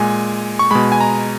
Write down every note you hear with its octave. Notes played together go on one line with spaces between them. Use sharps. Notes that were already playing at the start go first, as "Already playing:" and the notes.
Already playing: A#2 G#3 G#5
C#6
B2 G#3 B5
G#5
A#5